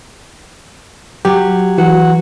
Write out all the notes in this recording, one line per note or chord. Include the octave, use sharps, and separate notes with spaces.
F#3 G4
E3 F#4